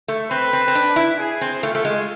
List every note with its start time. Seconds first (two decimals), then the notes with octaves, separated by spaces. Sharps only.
0.08 A3
0.30 C4 B4
0.53 C4
0.68 C4
0.75 D4
0.96 E4
1.19 G#4
1.41 C4
1.63 A3 F4
1.75 A3
1.85 G#3